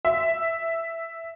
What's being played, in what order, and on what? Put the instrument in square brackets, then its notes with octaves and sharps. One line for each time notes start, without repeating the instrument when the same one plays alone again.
[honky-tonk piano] E5